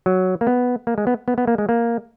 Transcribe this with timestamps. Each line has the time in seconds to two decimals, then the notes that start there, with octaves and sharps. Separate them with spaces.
0.06 F#3
0.41 A#3
0.47 B3
0.87 A#3
0.98 G#3
1.07 B3
1.28 B3
1.38 B3
1.47 A#3
1.58 G#3
1.69 A#3